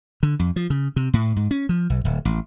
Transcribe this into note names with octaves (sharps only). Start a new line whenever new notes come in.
D3
F2
F3
C#3
C3
A2
G#2
C#4
F3
B1
D1
A1